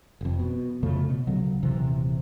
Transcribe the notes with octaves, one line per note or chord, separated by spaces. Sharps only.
F1 F2
B2
F2 C#3 F3 A3
B2
D2 C#3 F#3
D#1 C3 E3